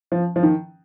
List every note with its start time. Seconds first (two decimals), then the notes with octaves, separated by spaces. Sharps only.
0.12 F3
0.36 F3
0.43 D#3